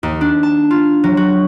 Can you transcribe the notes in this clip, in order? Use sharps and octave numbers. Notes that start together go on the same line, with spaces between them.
D#2
D4
A5
F4
F#3
F#4